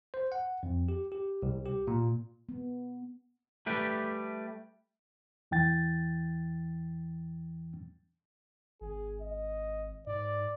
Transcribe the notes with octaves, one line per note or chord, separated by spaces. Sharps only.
C5
F#5
F2
G4
G4
C2
G4
A#2
B3
G3 A3 G4 B4
E2 E3 G5 A6
G#1 G#4
D#5
G#2 D5